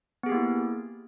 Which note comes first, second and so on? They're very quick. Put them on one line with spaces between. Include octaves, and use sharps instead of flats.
B3 G#4 G4 A#3 E4